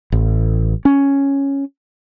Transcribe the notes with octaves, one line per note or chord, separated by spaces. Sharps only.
A1
C#4